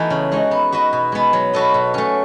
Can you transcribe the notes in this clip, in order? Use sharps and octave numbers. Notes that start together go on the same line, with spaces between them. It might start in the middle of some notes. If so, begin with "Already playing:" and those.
Already playing: E3 A3 B3 D#4 F#4 A4
C#3
G#3 D#4 F#4
B3
F#4 B4 D#5
B2
G#3 B3
F#3
B3 F#4 A4 D#5
B2
A3 C#4